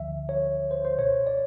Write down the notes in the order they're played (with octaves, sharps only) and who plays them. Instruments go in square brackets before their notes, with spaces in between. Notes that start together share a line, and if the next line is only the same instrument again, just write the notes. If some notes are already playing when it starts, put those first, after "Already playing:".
Already playing: [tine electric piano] D2 D3 F3 E5
C#5
C5
C5
C#2 B2 C#5
D5